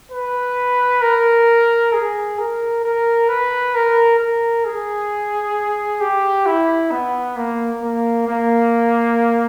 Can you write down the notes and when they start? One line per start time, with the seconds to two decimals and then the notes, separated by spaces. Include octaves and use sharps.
0.12 B4
1.02 A#4
1.93 G#4
2.39 A#4
2.84 A#4
3.28 B4
3.75 A#4
4.19 A#4
4.65 G#4
6.00 G4
6.46 E4
6.91 B3
7.37 A#3
7.82 A#3
8.27 A#3